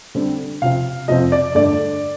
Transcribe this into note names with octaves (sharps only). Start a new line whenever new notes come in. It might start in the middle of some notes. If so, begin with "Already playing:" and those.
D3 G3 C4
C3 F3 C4 F5
F2 C3 F3 C4 D#5
D5
G2 D3 A3 D5